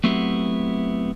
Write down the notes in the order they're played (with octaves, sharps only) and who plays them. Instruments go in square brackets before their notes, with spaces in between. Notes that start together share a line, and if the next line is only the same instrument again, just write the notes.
[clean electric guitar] F#3 A3 B3 C4 E4 G4